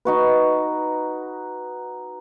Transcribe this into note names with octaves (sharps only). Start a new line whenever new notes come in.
D#4 F#4 B4